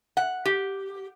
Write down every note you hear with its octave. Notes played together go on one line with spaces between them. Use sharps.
F#5
G4